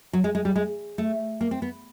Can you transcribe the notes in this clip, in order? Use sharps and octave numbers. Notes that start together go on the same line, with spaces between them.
F#3
G#3
G#3
G3
G#3
A3
A#3
C4
B3